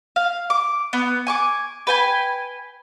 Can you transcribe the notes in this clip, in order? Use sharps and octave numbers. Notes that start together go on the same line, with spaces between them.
F5
D6
B3
G#5 C#6 D6
B4 G5 G#5